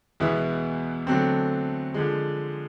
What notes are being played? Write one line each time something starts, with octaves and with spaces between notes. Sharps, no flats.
E2 B2 G#3 B3 E4
D3 F#3 A3 C4
D3 F3 G#3